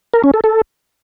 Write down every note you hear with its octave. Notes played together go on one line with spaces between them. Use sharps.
A#4
C#4
A4
A4